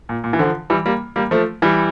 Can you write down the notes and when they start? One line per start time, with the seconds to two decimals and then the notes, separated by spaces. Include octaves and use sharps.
0.09 A#2
0.24 A#2
0.33 E3
0.39 D3 F3
0.70 E3 G3
0.86 G3 A#3
1.16 G3 A#3
1.31 F3 A3
1.62 E3 G3